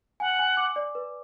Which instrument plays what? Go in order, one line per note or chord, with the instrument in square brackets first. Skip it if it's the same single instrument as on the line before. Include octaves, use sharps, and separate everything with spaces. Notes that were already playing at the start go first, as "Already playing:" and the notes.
[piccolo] F#5 [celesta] G#5
[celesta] G#5
D6
D5
B4